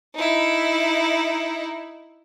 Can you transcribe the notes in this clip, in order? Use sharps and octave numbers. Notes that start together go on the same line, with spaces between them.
D#4 E4